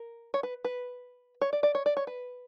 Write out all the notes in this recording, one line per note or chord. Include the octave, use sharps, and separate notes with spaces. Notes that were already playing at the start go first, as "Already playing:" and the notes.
Already playing: A#4
C#5
B4
B4
C#5
D5
D5
C#5
D5
C#5
B4